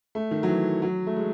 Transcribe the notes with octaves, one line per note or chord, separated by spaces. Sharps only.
A3
D#3
F#3
E3
F#3
A3
G#3